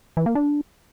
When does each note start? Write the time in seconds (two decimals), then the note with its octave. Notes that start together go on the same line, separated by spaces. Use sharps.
0.17 E3
0.26 A#3
0.35 D4